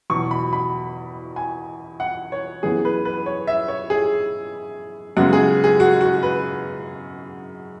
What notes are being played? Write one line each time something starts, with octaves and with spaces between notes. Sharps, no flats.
E2 B2 F#3 C#6
B5
B5
G#5
F#5
C#5
F#2 E3 B3 G#4
B4
B4
C#5
E5
C#5
G#4
F#2 C#3 G#3 B3 F#4
G#4
G#4
F#4
F#4
B4